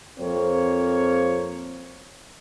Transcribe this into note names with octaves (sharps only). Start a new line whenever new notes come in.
F2 A#3 C4 C#5